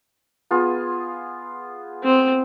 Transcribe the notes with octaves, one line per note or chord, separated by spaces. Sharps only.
B3 F4 G#4
C4